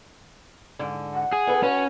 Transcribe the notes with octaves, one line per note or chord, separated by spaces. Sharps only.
G#2 D3
F#5
G#4
B3 A4 B4
C#4 F#4 B4